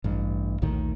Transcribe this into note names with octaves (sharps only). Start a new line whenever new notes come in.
A1 G2
A#1 D#2 A2 D#3